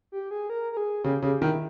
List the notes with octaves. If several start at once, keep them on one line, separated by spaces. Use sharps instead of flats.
G4
G#4
A#4
A#4
G#4
C#3 G4
C#3 G4
D#3 E4